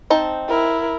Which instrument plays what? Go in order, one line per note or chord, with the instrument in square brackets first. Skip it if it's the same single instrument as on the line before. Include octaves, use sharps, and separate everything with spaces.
[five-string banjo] C4 D#4 A5
[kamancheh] E4 A#4